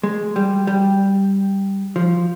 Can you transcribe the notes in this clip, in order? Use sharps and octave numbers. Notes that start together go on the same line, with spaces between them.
G#3
G3
G3
F3